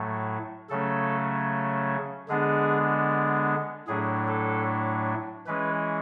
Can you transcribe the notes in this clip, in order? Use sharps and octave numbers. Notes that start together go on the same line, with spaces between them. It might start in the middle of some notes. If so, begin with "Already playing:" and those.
Already playing: A2 F#3 A3
C#3 F#3 A3 C#4 A4
D3 G#3 B3 D4 G#4
A2 F#3 A3 D4 G#4
A4
E3 G#3 C#4 B4